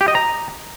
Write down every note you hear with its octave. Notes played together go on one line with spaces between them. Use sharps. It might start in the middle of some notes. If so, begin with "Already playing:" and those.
G4
D#5
A#5